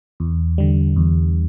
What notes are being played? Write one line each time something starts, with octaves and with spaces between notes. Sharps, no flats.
E2
D3 G3
E2